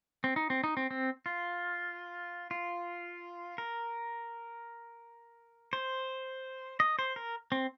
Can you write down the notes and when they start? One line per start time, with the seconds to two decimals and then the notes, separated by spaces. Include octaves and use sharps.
0.24 C4
0.36 D#4
0.50 C4
0.64 D#4
0.77 C4
0.91 C4
1.26 F4
2.51 F4
3.58 A#4
5.73 C5
6.80 D#5
6.99 C5
7.16 A#4
7.52 C4